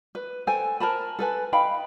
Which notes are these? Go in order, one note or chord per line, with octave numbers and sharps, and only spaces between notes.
B4
A4 C5 G5 G#5
A#4 C5 A5 B5
A4 B4 G#5
D#4 F5 G5 B5